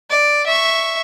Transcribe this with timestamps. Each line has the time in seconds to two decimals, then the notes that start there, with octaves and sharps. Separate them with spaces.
0.10 D5
0.47 E5 C#6